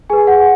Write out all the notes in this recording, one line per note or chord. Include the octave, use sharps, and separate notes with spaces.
G#4 B4 G#5
F#5